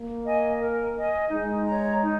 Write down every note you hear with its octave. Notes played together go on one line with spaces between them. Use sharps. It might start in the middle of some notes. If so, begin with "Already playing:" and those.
Already playing: A#3
D#5 G#5
A#4
D#5 G#5
G#3 D#4
C#5 A#5
D#4